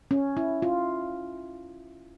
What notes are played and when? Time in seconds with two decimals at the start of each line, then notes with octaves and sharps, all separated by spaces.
0.11 C#4
0.37 E4
0.62 F4